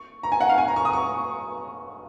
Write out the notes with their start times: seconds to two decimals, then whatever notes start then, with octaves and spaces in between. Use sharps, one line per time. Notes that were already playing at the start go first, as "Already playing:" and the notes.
Already playing: C#6
0.23 A#5
0.32 G#5
0.41 F#5
0.49 F5
0.58 G#5
0.68 A#5
0.76 C#6
0.85 D#6
0.93 C#6